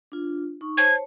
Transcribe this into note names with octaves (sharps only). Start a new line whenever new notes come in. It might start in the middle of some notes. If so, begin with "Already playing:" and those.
D4 F4
D#4 C#6
C5 C#5 A5 G#6
C#5